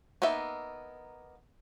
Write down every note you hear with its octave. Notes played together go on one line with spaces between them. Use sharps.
A#3 B3 D#4 E5